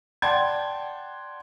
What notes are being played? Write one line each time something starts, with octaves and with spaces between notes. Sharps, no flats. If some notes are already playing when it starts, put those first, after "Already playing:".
D5 F#5 G5 A5 C6 G#6